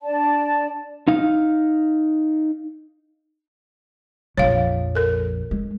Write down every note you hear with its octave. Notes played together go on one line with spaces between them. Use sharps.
D4 D5 A5
D#4 F5
A#1 F2 C#5 F5
A4 A#4
G#3